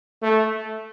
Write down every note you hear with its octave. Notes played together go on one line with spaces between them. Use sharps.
A3